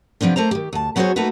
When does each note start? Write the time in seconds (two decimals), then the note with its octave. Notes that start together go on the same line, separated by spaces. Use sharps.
0.21 C3 F3 B3 C4 D4
0.36 A3 A#3 C5 A#5
0.51 D#3 G4
0.73 D2 A5
0.96 F#3 B3 F#4 G#4 C5 C#5
1.16 A3 A#3 D#4 F#4 B4